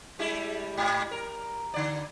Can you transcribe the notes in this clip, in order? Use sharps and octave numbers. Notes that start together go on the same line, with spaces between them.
G3 G#3 E4
G#2
A#4
D3 D5